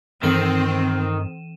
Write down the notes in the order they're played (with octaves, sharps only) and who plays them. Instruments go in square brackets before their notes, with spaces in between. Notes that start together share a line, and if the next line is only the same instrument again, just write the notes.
[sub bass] G2 [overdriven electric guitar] D#3 [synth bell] E3 D#7 E7 [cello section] C4